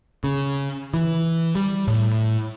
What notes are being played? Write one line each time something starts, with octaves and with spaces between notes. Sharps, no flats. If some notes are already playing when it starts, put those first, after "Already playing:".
C#3
E3
G3
A2